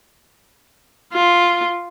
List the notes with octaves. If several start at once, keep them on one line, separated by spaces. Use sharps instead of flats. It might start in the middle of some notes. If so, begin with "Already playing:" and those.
F4